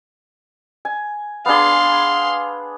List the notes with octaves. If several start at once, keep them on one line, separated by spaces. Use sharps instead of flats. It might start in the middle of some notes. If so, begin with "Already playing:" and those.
G#5
B3 D4 G#4 F5 C6